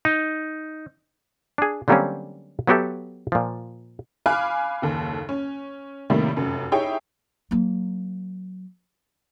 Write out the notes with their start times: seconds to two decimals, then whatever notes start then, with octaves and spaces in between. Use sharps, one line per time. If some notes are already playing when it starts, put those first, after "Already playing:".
0.05 D#4
1.58 D4 G#4
1.88 D3 F#3 G3 A#3 C4 C#4
2.67 F#3 B3 F#4 G4 A4 E5
3.32 A#2 F3
4.26 F5 G#5 B5 D6 F6 F#6
4.82 F#1 D#2 A4
5.29 C#4
6.10 A2 C3 D#3 G3 A3 A#3
6.37 F1 F#2
6.72 D#4 E4 G4 G#4 C#5 G5
7.51 F#3 A#3